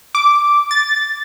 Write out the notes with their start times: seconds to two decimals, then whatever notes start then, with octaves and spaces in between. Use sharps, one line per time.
0.15 D6
0.71 A6